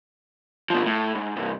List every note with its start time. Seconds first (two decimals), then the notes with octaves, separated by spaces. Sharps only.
0.70 B2 F3
0.86 A2
1.15 G#2
1.37 C2 G2